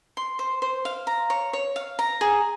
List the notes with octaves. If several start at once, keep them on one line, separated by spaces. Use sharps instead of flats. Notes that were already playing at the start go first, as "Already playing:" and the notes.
C6
C5
C5
F5
A#5
C#5
C#5
F5
A#5
G#4